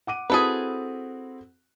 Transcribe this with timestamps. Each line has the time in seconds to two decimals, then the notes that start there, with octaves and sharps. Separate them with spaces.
0.07 F#5 D6 D#7
0.30 C4 E4 F#4 G#4 A4 B4